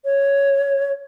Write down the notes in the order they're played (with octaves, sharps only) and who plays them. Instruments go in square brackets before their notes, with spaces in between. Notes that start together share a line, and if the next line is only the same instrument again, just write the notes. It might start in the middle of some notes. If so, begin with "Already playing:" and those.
[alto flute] C#5